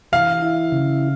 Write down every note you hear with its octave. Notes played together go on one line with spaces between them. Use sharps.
E3 F5
E4
C#3